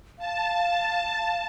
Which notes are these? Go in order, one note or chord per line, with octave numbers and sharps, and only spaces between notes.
F5 A5